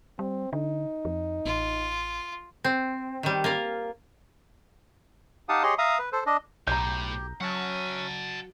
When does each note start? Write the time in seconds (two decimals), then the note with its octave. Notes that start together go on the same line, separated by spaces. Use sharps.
0.19 G3 C4
0.53 D3 D#4
1.05 F2
1.46 A1 F4
2.64 C4
3.23 D#3 G3
3.44 A#3 F4 A#4
5.49 D#4 G4 F5 F#5 A5 D#6
5.63 G4 G#4 C#5 D#5 C6
5.78 E5 F5 A#5 D#6
5.99 B4
6.12 A4 C5
6.26 D4 D#5
6.67 B1 A2 G4 A#5 G6
7.41 F#3 C#4 F#4 E5 F#5 A5